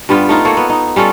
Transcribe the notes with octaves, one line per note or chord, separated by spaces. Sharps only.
G2 G3 B3 F4
A3 D#4 F4
A#3 A4 C#5
B3
D#4
G3 C#4 F4 A4